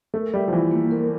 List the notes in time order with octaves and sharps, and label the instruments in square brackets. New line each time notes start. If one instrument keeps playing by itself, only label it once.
[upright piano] A3 [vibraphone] A#4
[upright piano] G3 [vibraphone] E5
[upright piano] F3
[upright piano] E3 [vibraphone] F4
[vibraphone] A#3
A#4